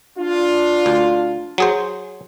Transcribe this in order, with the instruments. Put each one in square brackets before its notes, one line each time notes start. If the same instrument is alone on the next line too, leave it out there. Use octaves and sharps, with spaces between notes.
[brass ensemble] D4 F4
[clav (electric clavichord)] D2
F#3 G#4 C5